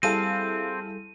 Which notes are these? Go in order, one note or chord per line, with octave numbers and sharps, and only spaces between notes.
G3 C4 E4 G#4 A4 F5 A5 D#7